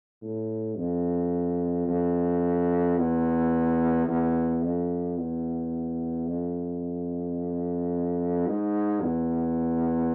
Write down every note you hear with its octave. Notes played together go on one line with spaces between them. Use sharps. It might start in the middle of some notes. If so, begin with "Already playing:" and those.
A2
F2
F2
E2
E2
F2
E2
F2
G#2
E2